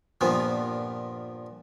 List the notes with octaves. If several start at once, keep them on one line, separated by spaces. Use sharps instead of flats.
G2 A#2 F3 B3